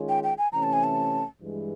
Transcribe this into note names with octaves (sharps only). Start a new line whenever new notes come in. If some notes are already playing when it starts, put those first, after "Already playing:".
Already playing: D#3 G#3 C#4 F4 G#4
G5
G5
G#5
C3 E3 A3 C#4 A#5
A5
G#5
A5
G2 E3 G#3